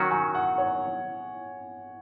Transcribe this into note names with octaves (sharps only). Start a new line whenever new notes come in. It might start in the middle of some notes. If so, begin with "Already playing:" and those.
Already playing: D#3 F#3 C#4 F#4
G#5
F#5
C#5